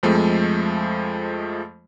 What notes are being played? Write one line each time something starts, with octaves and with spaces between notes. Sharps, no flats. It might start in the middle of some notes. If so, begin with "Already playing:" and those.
F2 F3 G#3 A3